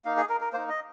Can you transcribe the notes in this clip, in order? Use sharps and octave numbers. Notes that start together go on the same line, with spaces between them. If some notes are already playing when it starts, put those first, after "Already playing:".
A#3 D#4 F5
G#4
A#4
A#4
A#3 D#4 C5
D#5